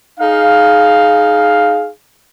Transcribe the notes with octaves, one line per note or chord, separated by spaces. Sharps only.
D#4 G#4 F5